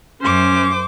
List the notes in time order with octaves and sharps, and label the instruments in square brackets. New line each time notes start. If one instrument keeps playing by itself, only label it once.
[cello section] F#2 [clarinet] C#4 [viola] C5 D6